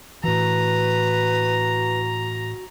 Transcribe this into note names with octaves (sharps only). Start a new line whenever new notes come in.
A2 E3 F#4 B4 A#5